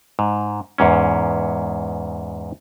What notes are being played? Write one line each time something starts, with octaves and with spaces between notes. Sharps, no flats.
G#2
E2 G#2 C#4